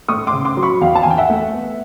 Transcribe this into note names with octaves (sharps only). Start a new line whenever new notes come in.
A3 C#6 D#6
C6 D6
C#3
C6 D6
F#3
B5 C#6
E2 F5 G5
A5
G#5
E2 G5
E5 F#5
A3
B3